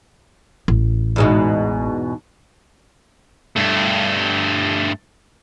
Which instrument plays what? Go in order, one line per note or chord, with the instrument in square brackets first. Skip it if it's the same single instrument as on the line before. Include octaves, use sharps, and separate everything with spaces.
[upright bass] A1
[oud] E2 G#2 B2
[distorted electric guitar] G2 A3